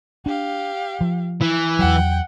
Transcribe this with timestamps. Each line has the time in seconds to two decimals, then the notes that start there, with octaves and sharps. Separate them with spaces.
0.26 D4 G4 F5
1.01 F3
1.42 E3
1.79 E2 F#3 F#5 G5